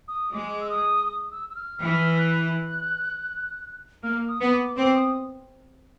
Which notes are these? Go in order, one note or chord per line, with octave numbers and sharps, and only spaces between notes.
D#6
G#3 D6
E6
D#6
D#6
E6
E6
F6
E3 F6
F#6
A#3 F6
D#6
B3
D6
C4 D6
D#6